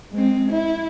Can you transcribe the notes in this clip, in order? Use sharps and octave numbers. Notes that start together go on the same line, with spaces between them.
G#3 C4
E4